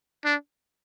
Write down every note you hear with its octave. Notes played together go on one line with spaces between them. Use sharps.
D4